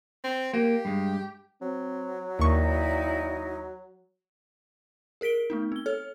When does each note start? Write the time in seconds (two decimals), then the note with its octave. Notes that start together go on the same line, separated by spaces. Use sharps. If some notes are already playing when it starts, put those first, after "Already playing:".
0.24 C4
0.53 A#3 G4
0.85 G2 G#3
1.62 F#3 C4
2.39 D#2 D#4 E4 D5 F5 G5 C#6
5.21 G#4 A#4 B6 D7 G7
5.50 A3 B3 D#4
5.72 C4 G7
5.86 A4 C#5 F6